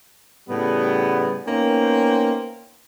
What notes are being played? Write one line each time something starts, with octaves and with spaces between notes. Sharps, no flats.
A2 C#3 G3 B3
A#3 B3 C#4 D#4 C5 G5